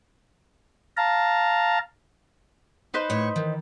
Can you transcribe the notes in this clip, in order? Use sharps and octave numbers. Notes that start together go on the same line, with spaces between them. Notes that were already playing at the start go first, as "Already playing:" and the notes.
F5 A5 A#5
D#4 B4 C5
A2 C#5
D#3 E3